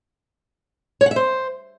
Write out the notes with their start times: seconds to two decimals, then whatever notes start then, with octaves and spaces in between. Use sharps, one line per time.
1.01 C#5
1.06 F#5
1.11 E5
1.16 C5